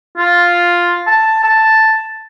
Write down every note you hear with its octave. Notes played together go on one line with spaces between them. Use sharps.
F4
A5
A5